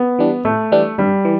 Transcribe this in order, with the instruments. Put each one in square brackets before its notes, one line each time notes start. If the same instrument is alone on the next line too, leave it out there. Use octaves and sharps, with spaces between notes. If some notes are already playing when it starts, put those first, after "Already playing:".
Already playing: [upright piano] B3
[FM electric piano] E3 G3 D4
[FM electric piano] A2 [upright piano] A3
[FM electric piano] E3 G3 D4
[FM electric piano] G2 [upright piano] G3
[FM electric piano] E3